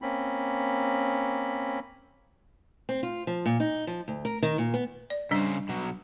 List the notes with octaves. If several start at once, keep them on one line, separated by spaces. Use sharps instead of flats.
A#3 C4 C#4 B5
C4
F4
F3
A#2
D#4
F3
D2
A#4
D#3
A#2
B3
D5
C#3 G3 D4 C5
B2 F#3